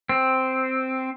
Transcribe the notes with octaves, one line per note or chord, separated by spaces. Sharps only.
C4